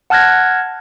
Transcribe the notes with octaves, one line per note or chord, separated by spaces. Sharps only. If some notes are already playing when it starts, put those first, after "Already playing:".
F#5 A5 F6 F#6 G#6 A#6